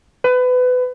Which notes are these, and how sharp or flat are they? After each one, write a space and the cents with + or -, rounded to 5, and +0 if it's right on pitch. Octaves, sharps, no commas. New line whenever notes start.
B4 +25